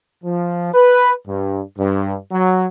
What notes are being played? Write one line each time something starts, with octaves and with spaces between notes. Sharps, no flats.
F3
B4
G2
G2
F#3